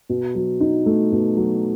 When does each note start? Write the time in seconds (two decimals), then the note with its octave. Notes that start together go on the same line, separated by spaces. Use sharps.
0.09 B2
0.35 F#3
0.60 D#4
0.86 A3
1.12 B2
1.37 F#3